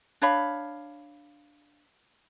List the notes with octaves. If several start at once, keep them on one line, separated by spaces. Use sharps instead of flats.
D4 C#5 F5 B5